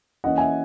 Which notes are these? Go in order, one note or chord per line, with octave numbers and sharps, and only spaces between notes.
E3 A#3 C#4 D#5 F#5
E5 G#5